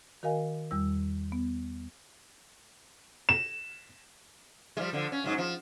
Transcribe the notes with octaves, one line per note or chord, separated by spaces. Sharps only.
D#3 F#4 A#4 D#5 F5 G#5
E2 G3 E6
B3
E7
F3 G3 G#3
D3 F3
C#4
G#2 F#3 D#4
F3